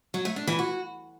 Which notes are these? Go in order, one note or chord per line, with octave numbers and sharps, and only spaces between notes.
F#3
A3
D4
E3
F#4